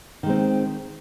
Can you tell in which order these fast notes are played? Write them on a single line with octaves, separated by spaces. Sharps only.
D#3 G#3 C4